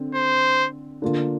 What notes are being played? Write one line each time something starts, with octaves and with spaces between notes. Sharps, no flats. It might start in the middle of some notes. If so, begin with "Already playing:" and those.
Already playing: D3 C4
C5
D3 A#3 F4